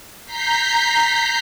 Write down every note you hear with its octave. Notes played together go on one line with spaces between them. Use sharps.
A#5 G6 B6 C7